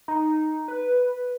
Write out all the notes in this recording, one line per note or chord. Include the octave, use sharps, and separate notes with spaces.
D#4
B4